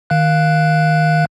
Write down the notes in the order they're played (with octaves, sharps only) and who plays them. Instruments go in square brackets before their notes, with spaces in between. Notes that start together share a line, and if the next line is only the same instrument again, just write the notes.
[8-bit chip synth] D#3 F5 F#6